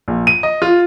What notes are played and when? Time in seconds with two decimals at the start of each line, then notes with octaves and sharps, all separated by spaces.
0.08 A#1
0.27 D#7
0.43 D#5
0.62 F4